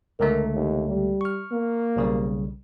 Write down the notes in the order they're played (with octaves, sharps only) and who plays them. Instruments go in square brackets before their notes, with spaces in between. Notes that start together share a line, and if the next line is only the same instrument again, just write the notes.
[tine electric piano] C#2 D3 A3 [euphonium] A#4
[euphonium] D#2
G3
[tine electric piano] C#6 F6
[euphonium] A#3
[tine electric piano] B1 C#3 G3